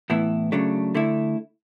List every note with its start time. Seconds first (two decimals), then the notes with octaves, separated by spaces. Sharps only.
0.10 A2 E3 B3 E4
0.52 C#3 F#3 A3 D4
0.95 D3 A3 E4